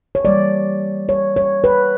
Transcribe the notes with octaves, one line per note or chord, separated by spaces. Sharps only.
C#5
E3 G3 A#3 D5
C#5
C#5
B4